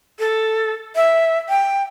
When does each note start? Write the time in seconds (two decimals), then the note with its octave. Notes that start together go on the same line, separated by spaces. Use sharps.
0.19 A4
0.96 E5
1.49 G5